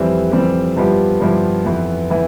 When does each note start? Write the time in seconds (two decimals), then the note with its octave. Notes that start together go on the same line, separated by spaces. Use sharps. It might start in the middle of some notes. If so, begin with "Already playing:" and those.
Already playing: F2 E3 G3 C4 G4
0.32 F2 E3 G3 C4 G4
0.76 G2 F3 B3 E4 G4
1.20 G2 F3 B3 E4 G4
1.65 F2 E3 B3
2.10 E3 B3